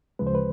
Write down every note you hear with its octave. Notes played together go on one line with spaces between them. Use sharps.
D2 C#3 F3 G#3 B4
C5
B4